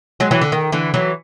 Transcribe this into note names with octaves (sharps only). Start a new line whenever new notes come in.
F#3 G#3
E3 F#3
D3
D#3
D3 E3
E3 F#3